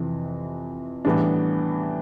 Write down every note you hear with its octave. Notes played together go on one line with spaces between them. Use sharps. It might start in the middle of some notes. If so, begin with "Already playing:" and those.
Already playing: F2 C3 E3
A2 E3 G3 B3 D4